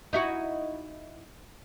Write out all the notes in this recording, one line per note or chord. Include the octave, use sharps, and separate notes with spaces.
D#4 E4 F#4